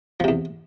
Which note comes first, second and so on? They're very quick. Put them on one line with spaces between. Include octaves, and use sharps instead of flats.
F3 C3 E2